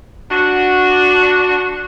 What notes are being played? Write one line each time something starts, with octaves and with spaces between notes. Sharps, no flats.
D4 F#4